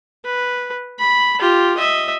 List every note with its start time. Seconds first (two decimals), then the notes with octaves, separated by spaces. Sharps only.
0.25 B4
0.99 B5
1.40 F4 G4
1.77 D#5 E5